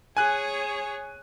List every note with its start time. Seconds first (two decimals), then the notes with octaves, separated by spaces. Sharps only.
0.17 G#4 C#5 G#5 F#6